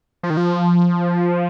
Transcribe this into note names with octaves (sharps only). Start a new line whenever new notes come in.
F3
D#3
F3